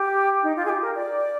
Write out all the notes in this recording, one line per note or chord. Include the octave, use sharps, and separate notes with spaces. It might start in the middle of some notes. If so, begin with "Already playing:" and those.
Already playing: G4
D#4
F4
G#4
G4
A#4
D5